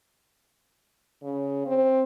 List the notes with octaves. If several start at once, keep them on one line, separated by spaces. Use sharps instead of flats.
C#3
C4